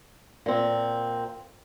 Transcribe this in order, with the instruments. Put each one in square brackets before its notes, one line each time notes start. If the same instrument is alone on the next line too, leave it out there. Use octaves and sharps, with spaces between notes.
[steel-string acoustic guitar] A#2 C4